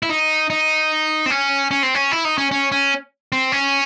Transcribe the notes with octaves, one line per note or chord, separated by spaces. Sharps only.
E4
D#4
D#4
C4
C#4
C#4
C4
C#4
E4
D#4
C#4
C#4
C#4
C4
C#4